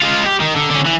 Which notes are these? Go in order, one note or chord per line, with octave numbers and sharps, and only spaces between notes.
G#3 F4
G4
D#3
D3
D3 C#4
E3